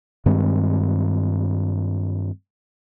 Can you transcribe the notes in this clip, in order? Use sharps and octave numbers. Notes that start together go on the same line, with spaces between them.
G2 D#3 G#3 C4